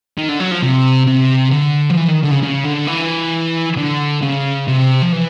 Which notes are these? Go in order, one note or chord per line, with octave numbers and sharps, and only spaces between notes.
D#3
D3
F#3
F3
C3
C3
D3
F3
E3
D#3
D3
C#3
C#3
D3
E3
D3
C#3
C3
F3
E3